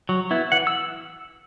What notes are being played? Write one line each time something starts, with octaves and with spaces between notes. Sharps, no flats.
F#3
B3 E4
E3 F#5
E6